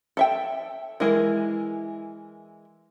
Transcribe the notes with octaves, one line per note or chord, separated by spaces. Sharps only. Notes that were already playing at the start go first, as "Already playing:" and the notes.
A4 E5 G5
E3 G#3 E4 A#4